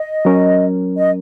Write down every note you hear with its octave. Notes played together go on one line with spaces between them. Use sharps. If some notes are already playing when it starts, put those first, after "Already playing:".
Already playing: D#5
F#3 C#4 A#4
D#5